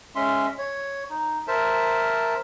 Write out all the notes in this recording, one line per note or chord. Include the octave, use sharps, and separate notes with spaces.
G#3 C#4 E5 C6
C#5
D#4
A#4 C5 E5 A5